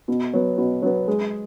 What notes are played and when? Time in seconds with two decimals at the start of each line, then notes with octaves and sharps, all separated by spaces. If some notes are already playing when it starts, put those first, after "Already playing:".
0.08 B2
0.33 F#3 B3
0.58 B2
0.82 F#3 B3
1.08 G#3